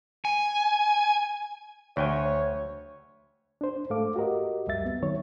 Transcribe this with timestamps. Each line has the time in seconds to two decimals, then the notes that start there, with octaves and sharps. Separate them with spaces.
0.25 G#5
1.97 D2 C#5 G5 G#5
3.61 D4 C5
3.90 G#2 A3 A4 F5 D6
4.16 F#4 G4 A#4 D#5
4.67 C#2 F#2 G3 E5 A6
4.86 B3
5.03 D#3 F#3 C#5